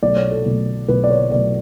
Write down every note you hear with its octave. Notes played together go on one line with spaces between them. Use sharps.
B1 B2 A3 D5
C#5
A4
B1 B2 A3
B1 B2 A3 B4
D5
C#5
B1 B2 A3 D5